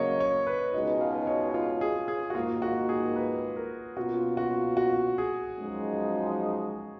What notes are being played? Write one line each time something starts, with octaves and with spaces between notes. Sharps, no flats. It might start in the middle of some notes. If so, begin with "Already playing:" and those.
Already playing: C#3 F#3 A#3 C#5 D#5 F5
C#5
B4
C#2 B2 G#3 D#4 F#4 D#5
F5
C#5
F4
G#4
G#4
F#4
G#2 D#3 A#3 F4
F#4
G#4
B4
A#4
B2 A#3 C#4 F4 F#4
F#4
F#4
G#4
F#2 F3 G#3 D#4